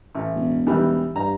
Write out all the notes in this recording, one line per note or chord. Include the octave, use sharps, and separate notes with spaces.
A1
E1
D#3 E3 G3
G2 A#5